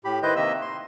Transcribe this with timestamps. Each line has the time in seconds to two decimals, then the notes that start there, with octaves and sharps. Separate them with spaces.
0.05 A2 G4 B5
0.23 D#3 E4 B4 C5 D#5 G6
0.36 C3 D#3 A#3 D#5 E5 E6
0.62 C6